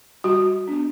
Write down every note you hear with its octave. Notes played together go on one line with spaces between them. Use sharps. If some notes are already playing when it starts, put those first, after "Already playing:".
G3 F#4
B3 D4